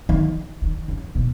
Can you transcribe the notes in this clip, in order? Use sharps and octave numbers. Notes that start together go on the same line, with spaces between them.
D#3
D#3
C#3
B2